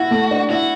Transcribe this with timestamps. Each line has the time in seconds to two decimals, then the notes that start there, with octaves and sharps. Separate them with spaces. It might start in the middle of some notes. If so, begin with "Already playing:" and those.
Already playing: E4 F#4
0.11 A3
0.31 D4
0.50 E4 F#4